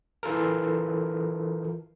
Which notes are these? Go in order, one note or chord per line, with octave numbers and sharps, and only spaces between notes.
E3 F4 A4 A#4